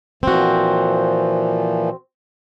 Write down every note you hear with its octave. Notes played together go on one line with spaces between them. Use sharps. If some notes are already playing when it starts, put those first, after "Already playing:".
A#2 E3 F3 C4 F#4